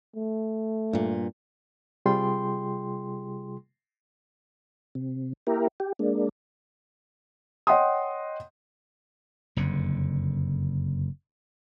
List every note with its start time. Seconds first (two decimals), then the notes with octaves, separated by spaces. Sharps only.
0.16 A3
0.93 G2 A#2
2.06 C3 G3 F4 G#4 G5 C6
4.95 C3
5.47 A#3 E4 G4 A#4
5.80 G4
5.99 G#3 A#3 D4
7.67 C#5 D#5 F#5 G5 C6 D#6
9.56 F#1 F2 D3